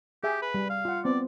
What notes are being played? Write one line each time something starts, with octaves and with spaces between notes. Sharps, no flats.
G4 G#4 E5 G#5
B4
G3
F5
F4 F#5
B3 C4 D5